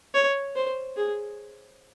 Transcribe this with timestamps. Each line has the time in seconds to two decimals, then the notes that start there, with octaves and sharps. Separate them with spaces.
0.14 C#5
0.56 C5
0.97 G#4